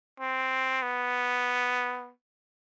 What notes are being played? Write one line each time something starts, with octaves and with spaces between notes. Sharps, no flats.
C4
B3